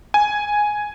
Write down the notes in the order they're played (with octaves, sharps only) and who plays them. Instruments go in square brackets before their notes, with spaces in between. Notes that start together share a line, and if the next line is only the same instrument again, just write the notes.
[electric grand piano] G#5